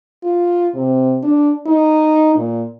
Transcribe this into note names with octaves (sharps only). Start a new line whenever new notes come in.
F4
C3
D4
D#4
A#2